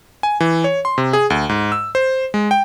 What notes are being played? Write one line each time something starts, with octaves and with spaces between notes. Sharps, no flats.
G#5
E3
C#5
C6
C3
G#4
D2
G#2
E6
C5
G#3
G5